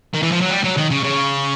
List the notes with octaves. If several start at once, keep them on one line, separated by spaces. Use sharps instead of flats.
D#3
E3
F3
F#3
G3
F#3
D#3
C#3
C#3